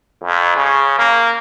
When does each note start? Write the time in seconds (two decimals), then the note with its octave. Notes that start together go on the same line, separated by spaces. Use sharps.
0.24 F2
0.57 C#3
0.98 A#3